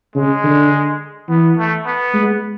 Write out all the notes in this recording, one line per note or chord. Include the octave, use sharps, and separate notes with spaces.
C#3 G#3
D3
E3 B3
A3
B3
G#3